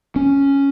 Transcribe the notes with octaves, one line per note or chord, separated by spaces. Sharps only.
C#4